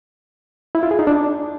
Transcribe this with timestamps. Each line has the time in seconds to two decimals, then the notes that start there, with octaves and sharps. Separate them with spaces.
0.75 E4
0.83 F4
0.91 G#4
0.99 D#4
1.07 D4